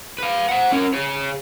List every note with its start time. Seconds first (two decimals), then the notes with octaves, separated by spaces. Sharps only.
0.18 B4 F5
0.49 C5 F#5
0.72 C#4 A#4
0.93 G#4 C#5